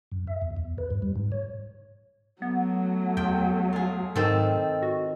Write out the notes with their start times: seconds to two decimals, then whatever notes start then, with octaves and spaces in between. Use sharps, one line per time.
0.12 F#2
0.27 E5
0.42 E2
0.57 E2
0.78 B4
0.91 G2
1.02 G3
1.16 G#2
1.32 C#5
2.42 F#3 A3 B3
3.17 E2 G5
3.73 F4 G#4
4.15 G#2 D#3 C4 A4
4.82 F#4